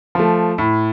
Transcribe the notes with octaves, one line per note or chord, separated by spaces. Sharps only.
F3 A3
A2